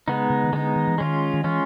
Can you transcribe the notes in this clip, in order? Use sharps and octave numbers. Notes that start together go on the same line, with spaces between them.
C#3 G#3 B3 D#4
C#3
D#3
D3 G#3 B3 D#4
D#3
E3
D#3 G#3 C#4 F4
D#3
E3 G#3 C#4 F4